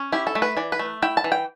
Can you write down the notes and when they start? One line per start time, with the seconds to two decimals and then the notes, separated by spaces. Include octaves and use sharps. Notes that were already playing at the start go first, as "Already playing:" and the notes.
Already playing: C#4
0.12 E4 G4
0.27 A4
0.35 A3
0.42 B4
0.57 E3 D5
0.72 B4
0.79 A3
1.02 E4 G5
1.17 A5
1.24 E3
1.32 G5